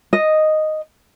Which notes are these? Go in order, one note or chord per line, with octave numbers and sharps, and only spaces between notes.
D#5